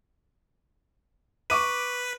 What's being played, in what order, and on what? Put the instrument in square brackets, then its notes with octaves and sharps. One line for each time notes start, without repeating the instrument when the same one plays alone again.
[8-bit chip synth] B4 [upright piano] C#6 D6 D#7